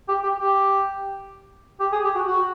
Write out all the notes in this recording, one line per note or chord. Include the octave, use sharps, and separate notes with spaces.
G4
G4
G4
G4
G#4
G4
F#4
F#4